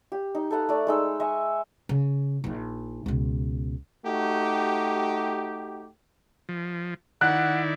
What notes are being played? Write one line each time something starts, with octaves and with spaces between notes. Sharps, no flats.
G4
D#4
A4 B4 F5 F#5
A3 D5
G#3 D#4 E6
D#5 E5 G#5 C#6
C#3
A#1 D#4
C#2 B2
A3 D#4 F#4 G4
F3
D#3 E4 D5 F#5 F#6